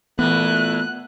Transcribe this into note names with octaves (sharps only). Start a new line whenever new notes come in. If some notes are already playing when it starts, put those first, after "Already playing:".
A#2 E3 A3 B3 F#6